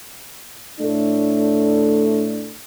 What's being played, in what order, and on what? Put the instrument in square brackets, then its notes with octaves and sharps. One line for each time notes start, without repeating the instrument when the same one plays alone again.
[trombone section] A2 A3 D4